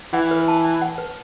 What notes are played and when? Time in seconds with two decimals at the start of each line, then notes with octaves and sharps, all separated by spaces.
0.13 E3 F#5
0.31 B4
0.48 A5
0.65 A5
0.82 F#5
0.98 B4